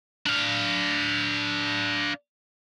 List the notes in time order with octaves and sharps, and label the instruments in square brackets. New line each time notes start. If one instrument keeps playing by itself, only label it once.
[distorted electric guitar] D4 F5